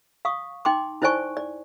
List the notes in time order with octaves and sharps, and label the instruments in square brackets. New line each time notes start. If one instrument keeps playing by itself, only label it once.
[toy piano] F5 C#6 D#6
D#4 G5 C6 D6
D#4 E4 C5 D5 G#5 C#6
D5